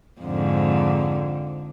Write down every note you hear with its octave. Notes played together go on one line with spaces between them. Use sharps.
F2 G#2 D3